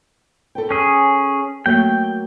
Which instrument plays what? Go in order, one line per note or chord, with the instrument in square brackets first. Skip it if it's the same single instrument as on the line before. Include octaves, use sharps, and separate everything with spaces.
[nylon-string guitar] A4 B4 G5
[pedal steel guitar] C#4 G#4
[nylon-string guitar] F#3 A3 A#3 [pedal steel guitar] G5